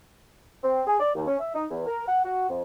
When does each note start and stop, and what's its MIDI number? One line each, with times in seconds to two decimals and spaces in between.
0.63 0.82 60
0.87 0.97 68
1.00 1.10 74
1.15 1.26 39
1.27 1.36 61
1.40 1.53 76
1.54 1.65 63
1.71 1.83 40
1.87 2.03 70
2.08 2.24 78
2.24 2.47 66
2.50 2.62 41